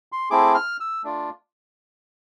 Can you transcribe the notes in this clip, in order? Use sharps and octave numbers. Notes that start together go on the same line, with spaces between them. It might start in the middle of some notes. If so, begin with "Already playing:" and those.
C6
A3 C4 E4 G#4 D6
F6
E6
A3 D4 F4